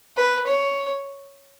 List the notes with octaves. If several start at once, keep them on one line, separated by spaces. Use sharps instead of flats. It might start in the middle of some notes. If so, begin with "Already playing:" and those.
B4
C#5